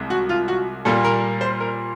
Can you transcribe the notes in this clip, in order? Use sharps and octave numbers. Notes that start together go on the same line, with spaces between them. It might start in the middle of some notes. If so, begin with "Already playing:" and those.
Already playing: C2 C3 G#3
F#4
F4
F#4
A#2 G3 A#3 A4
A#4
C5
A#4